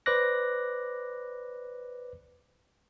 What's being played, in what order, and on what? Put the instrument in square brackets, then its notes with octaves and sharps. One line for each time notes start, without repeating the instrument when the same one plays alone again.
[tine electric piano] B4 C5 D5 D6 F#6 A#6